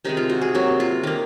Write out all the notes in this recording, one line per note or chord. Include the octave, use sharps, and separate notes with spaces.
C3 D#3 G#3 D#4
F4
F#4
G#4
C3 F#3 A#3 F#4
F4
D#3 A#3